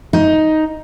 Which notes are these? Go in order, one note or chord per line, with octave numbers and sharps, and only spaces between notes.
D#4